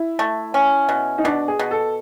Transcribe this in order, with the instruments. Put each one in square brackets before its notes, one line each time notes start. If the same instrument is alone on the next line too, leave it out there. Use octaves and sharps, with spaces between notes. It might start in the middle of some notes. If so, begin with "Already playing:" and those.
Already playing: [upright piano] E4
[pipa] A3
C#4
B2
[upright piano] D#4
[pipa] B2 [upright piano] D4
[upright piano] G#4
[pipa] B2
[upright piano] A4